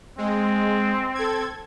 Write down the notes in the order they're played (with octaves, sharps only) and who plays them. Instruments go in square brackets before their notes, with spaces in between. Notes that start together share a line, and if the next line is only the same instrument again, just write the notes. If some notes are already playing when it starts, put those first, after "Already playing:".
[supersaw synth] G#3 [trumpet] C4
[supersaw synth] A4 G#6